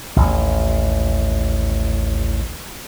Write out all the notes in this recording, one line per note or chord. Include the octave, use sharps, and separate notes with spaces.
A1 D#2